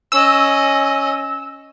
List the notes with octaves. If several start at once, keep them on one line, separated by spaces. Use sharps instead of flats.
C#4 D#5 E6